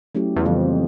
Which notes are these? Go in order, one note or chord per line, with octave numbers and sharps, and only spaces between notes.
F#3 A3 C#4 E4 G4
E2
F2 C#3 E3 G3 B3